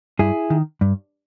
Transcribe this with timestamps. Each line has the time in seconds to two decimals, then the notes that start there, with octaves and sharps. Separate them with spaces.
0.19 G2 E4 G#4
0.50 D#3
0.81 G2